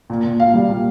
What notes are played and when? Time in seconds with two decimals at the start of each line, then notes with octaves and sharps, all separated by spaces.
0.10 A#2
0.24 A#2
0.39 A#2 F5
0.54 G3
0.69 A#2